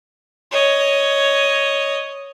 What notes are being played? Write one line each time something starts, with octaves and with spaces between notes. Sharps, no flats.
C#5 D#5